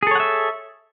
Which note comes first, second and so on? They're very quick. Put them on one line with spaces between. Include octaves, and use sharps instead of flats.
G#4 A4 C#5 F#5 E5